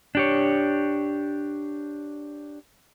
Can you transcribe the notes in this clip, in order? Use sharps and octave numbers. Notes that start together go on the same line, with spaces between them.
D4 G4 C#5